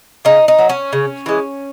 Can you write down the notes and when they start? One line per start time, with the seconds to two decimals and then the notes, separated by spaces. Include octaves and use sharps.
0.25 C#3 D#4
0.48 D#4
0.59 F#3
0.69 C#4
0.93 C#3
1.26 E3 G#3